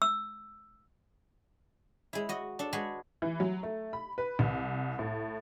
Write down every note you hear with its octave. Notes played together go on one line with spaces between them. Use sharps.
E6
G#3 E4
F#4 D#5
D4 A4
G#3 F#4 G#4 B4 G#5
E3
F#3
A3
B5
B4
C2
A2